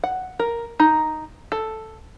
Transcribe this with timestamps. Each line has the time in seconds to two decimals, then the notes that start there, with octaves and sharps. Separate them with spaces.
0.04 F#5
0.39 A#4
0.80 D#4
1.52 A4